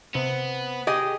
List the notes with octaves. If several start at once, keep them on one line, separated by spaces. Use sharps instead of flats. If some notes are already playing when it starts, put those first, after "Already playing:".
C3 B3
G4 G#4 D#5